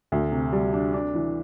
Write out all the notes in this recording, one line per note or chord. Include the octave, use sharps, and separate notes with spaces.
D2
C3
G3
D4
D4
E3